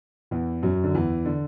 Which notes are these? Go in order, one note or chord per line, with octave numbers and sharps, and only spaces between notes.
E2 E3
F#2 F#3
D3
E2 E3
D3